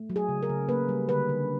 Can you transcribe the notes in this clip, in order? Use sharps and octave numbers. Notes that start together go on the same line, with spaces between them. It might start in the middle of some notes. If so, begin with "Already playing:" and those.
Already playing: A3
F#3
G#4
C#3
A#4
C#3
A#3 B4
G3
D3 B4
D3